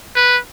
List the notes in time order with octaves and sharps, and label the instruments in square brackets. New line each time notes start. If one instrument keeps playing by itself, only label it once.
[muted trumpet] B4